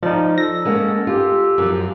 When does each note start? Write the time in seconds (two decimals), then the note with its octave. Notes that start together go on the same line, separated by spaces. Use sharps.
0.03 F3 D#4 D5
0.38 A4 A#6
0.65 G#3 A#3 B3 C#4
1.07 F4 G4
1.58 F#2 F3